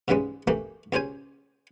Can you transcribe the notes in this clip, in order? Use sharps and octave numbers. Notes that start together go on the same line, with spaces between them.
G#2 C#3 E3 G3 G#3
E3 A3 A#3 G4
C#2 C#4 G4 C5 G#5